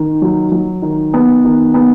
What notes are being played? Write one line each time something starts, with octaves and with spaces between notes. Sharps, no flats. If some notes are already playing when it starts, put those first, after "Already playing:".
Already playing: D#3
F#3
F#3
D#3
B3
D#3
B3